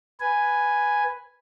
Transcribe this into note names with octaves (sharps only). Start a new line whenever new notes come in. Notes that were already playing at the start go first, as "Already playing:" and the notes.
B4 G#5